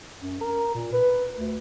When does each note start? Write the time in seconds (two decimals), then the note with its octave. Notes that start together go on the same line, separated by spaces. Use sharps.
0.20 F#2
0.41 A#4
0.74 A#2
0.93 B4
1.35 D2